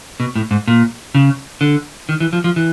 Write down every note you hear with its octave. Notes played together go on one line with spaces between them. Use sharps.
B2
A2
G#2
A#2
C#3
D3
D#3
E3
F3
F3
E3